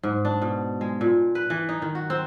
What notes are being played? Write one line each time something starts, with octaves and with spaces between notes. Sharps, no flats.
G#2
D4
B2
G#3
A#2
B4
E3
D#4
D#3
F#4
C4